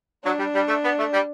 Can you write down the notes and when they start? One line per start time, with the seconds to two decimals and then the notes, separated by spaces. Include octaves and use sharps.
0.24 F#3 D4
0.38 G3
0.54 G3
0.68 A3
0.84 B3
0.98 A3
1.13 G3